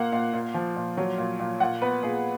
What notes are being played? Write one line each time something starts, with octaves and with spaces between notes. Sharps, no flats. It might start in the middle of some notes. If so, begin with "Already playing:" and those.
Already playing: A#2 A#3 F5 F#5
A#2 F5
A#2
F3
A#2
F#3
A#2
A#2
A#2 F#5
B3 B4
A#2 G#4